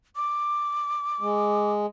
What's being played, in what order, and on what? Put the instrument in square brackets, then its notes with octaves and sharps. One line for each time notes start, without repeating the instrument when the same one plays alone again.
[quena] D6
[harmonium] G#3